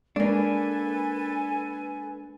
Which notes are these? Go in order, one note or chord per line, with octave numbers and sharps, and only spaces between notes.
G#3 A#3 D4 A4 B4 G#5